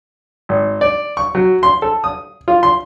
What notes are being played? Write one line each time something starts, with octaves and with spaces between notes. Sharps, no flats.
G#1
D5
C#6
F#3
C6
A4
D#6
F4
C6